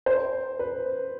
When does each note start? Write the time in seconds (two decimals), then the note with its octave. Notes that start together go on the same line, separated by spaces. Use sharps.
0.06 C5
0.59 B4